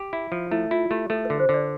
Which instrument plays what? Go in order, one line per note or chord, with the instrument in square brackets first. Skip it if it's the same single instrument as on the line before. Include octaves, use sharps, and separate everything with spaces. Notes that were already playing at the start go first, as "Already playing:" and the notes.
Already playing: [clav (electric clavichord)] G4
E4
F3
[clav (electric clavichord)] A3 [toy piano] E4
[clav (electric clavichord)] E4 [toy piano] F4
[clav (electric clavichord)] A3 [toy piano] G4
[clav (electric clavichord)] A3 [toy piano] A4
[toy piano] B4
[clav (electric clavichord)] D3
[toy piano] C5
[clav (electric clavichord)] D3 [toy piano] D5